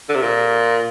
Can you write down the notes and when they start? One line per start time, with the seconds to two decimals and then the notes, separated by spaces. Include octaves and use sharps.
0.09 D3
0.15 C3
0.22 A#2